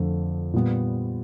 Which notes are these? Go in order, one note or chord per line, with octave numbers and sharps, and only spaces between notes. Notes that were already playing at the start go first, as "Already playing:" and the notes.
Already playing: F2 D3 F3 A3
A#2 G3 B3